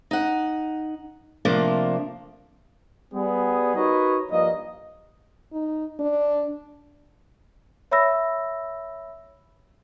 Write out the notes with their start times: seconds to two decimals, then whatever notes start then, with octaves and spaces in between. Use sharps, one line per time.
0.11 D#4 F#5
1.45 C3 F3 A3 A#3 D4
3.14 G3 B3 G#4
3.75 D#4 F#4 A#4 B4 C#5 D#5
4.30 G2 F3 A#3 D#5
5.53 D#4
6.00 D4
7.91 C#5 E5 B5 E6 A#6